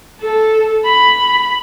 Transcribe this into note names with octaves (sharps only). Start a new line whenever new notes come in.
A4
B5